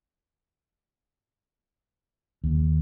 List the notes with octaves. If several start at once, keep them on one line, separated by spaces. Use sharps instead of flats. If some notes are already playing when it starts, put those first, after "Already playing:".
D#2